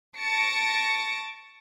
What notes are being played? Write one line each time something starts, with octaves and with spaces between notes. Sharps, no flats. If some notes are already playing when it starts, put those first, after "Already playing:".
A5 C#6 A6 A#6 C#7 D7